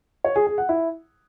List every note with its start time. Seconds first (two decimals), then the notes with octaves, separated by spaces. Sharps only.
0.25 C#5
0.36 G#4
0.47 G#4
0.58 F#5
0.69 E4